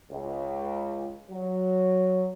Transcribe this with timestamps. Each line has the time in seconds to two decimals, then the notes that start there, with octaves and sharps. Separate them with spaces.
0.11 C#2
1.30 F#3